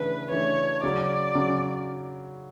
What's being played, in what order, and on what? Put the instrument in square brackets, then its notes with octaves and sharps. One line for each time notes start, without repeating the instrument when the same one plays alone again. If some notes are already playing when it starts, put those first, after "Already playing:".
Already playing: [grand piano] C#3 E3 A3 D4 [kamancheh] B4
[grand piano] C#3 E3 A3 D4 [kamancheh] C#5
[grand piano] C#3 F#3 C#4 [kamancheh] D5
[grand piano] C#3 F#3 C#4